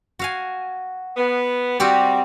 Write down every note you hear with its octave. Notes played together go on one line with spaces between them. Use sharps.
F#4 F5 G#5
B3
G3 C4 F#4 G4